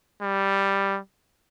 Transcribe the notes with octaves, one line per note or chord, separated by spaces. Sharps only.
G3